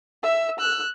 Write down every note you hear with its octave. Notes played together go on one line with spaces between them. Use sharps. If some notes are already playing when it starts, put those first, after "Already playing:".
E5 E6
E6 F#6